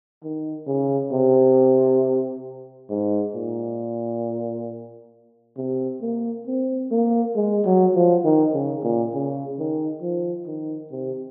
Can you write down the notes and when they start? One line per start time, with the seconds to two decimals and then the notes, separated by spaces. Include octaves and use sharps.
0.23 D#3
0.67 C#3
1.12 C3
2.90 G#2
3.34 A#2
5.57 C3
6.02 A#3
6.47 C4
6.91 A#3
7.35 G#3
7.65 F#3
7.95 F3
8.25 D#3
8.54 C#3
8.83 A#2
9.14 C#3
9.58 D#3
10.02 F3
10.47 D#3
10.91 C3